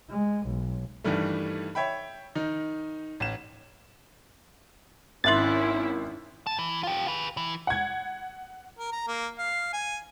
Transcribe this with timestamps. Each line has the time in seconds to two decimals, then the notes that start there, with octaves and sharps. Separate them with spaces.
0.10 G#3
0.47 B1
1.04 G2 D#3 E3 G3 A3
1.75 C#5 E5 G5 B5
2.35 D#3 D#4
3.20 A1 E7
5.24 G#1 C#4 E4 E5 C6 F#6 A6
6.47 B2 A5
6.59 E3
6.83 F4 G4
7.08 G#4 B4
7.37 E3
7.67 F#5 G#6
8.79 A#4
8.92 A#5
9.08 A#3
9.39 F5
9.73 G#5